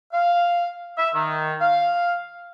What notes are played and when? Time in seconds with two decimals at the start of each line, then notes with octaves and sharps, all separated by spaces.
0.13 F5
0.97 E5
1.14 D#3
1.60 F5